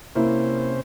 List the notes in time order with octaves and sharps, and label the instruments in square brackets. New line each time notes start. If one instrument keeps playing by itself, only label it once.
[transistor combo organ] C3 C#4 C5 [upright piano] A#3 E4